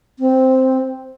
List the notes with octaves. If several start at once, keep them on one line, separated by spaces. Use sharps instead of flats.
C4